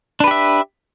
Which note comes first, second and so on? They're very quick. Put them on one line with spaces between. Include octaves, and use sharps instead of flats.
D4 B4 G4 E5